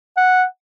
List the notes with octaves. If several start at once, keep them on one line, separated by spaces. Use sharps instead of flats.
F#5